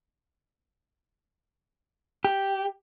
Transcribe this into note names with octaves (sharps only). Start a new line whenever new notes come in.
G4